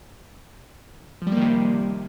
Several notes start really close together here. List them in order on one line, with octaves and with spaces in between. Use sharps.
F3 G3 A#3 D#3 C3